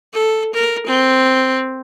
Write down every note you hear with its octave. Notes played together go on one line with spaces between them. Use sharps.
A4
A#4
C4